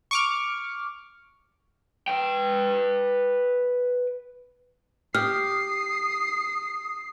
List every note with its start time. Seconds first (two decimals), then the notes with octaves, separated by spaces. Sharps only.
0.11 C#6 D6 F6
2.08 B4 G5
5.15 G4 D#6 F6 C7